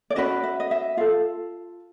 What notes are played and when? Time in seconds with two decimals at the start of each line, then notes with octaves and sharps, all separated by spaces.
0.10 D5
0.16 C#4 F#4 B4 D#5
0.43 E5
0.60 D#5
0.71 E5
0.97 F4 A4 F5